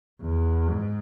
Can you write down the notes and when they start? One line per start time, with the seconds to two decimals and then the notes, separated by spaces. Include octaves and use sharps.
0.22 E2
0.71 G#2